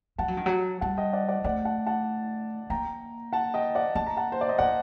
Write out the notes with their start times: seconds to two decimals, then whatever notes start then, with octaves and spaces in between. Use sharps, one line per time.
0.18 G3 F#5 A5
0.28 F#3
0.37 D#3
0.46 F#3
0.81 G3 F#5 A5
0.97 D#5 G5
1.13 D5 F#5
1.28 D5 F#5
1.44 A3 D5 F#5
1.65 F#5 A5
1.86 F#5 A5
2.70 A#3 G5 A#5
3.33 F#5 A5
3.54 D#5 G5
3.75 D5 F#5
3.95 A#3 A5
4.07 A#5
4.17 F#5 A5
4.32 C5
4.41 D5
4.49 D#5
4.58 A#3 D5 F#5